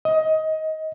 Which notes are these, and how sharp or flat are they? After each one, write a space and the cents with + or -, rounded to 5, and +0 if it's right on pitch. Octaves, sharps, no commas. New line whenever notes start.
D#5 +20